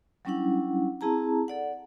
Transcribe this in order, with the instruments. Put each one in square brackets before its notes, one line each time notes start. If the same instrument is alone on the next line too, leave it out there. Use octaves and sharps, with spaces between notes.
[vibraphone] F#3 G3 C#4 D4 E4 F#5
C4 E4 G#4 A5 A#5
A4 D5 F#5